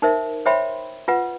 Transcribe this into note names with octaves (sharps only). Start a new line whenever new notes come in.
D#4 A#4 C5 E5
C5 C#5 E5 G5 B5 C6
F4 B4 F#5